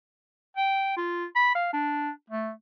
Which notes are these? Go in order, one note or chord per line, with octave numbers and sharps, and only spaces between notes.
G5
F4
B5
F5
D4
A3